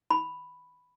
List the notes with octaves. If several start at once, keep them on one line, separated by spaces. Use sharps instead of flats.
B5